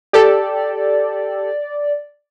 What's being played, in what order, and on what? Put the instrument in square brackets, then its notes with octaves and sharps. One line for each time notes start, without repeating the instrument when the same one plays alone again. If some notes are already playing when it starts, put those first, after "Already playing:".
[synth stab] G4 A4 [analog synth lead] D5